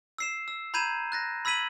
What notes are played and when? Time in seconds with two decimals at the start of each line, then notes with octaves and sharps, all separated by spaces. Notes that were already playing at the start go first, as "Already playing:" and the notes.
0.18 E6 C7 E7
0.48 E6
0.74 A#5 B5 G6 G#6 D#7 E7
1.12 F#6 A6 A#6
1.45 B5 E6 G#6 B6 D#7 F#7